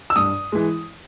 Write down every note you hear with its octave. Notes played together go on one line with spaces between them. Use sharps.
E6
G2 D#6
E3 G#3